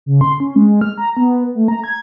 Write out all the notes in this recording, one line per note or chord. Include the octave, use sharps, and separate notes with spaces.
C#3
C6
C#4
G#3
F6
A#5
B3
A3
A#5
G#6